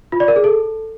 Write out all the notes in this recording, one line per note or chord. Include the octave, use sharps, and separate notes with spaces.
F4
D5
A#4
G#4
A4